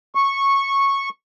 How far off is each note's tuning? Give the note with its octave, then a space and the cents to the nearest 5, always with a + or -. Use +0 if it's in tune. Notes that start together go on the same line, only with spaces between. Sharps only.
C#6 -10